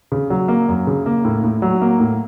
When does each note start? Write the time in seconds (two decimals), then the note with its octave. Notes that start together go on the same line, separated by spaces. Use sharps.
0.12 C#3
0.30 F#3
0.48 A#3
0.68 F#2
0.87 C#3
1.06 A#3
1.25 A2
1.43 A2
1.62 F#3
1.81 A#3
2.00 A2